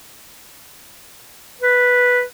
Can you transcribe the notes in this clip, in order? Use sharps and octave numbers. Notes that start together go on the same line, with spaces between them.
B4